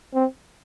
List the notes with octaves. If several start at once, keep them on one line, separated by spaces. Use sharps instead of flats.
C4